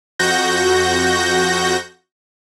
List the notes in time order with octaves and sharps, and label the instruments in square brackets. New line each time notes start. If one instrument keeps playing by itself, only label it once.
[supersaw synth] F2 F#4 G6 A#6